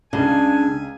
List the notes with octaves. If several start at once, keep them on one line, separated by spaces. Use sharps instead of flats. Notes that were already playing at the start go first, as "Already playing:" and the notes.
C#2 C#3 D4 D#4 G#5 B5